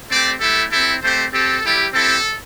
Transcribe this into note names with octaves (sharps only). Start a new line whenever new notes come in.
A3 C4 G4 D5
A3 E4 G4 A4
C4 E4 G4 A4
A3 C4 G4 C5
C4 G4 A4
G3 E4 G4
C4 E4 G4 A4